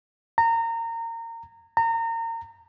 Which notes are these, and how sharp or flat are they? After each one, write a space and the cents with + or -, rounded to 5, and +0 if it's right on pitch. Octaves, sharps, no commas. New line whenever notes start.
A#5 -25
A#5 -30